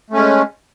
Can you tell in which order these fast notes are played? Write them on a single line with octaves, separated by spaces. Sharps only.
A3 C#4 G#3